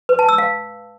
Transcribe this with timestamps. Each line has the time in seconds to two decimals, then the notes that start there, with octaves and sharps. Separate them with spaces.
0.09 B4
0.19 A5
0.29 E6
0.38 F5